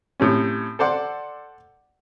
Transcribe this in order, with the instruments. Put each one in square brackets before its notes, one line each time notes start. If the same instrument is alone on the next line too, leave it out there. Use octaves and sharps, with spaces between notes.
[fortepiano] A2 C3 C#4
A4 C5 D5 F#5